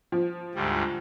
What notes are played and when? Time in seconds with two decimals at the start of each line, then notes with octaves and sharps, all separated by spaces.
0.12 F3
0.55 D2 G#2 G3